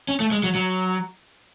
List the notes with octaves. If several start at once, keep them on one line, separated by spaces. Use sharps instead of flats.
C#4
A3
G#3
F#3
F#3